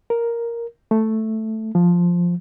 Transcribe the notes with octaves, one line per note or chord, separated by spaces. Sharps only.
A#4
A3
F3